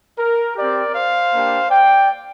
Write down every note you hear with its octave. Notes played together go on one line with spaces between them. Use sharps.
A#4
C4 G4 A#4 D5
C5 F5
A#3 D4 G4
D5 G5